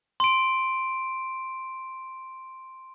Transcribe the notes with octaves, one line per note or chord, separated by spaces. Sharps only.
C6 D7